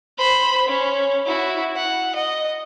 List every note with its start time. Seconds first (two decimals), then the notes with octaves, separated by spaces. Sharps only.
0.18 C5 B5
0.67 C#4
1.26 E4 F#4
1.76 F#5
2.15 D#5